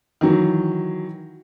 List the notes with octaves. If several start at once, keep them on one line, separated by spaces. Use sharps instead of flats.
D#3 E3 F#3